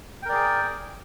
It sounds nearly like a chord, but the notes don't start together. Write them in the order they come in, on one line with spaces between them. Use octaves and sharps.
G5 A#4 D5 G#4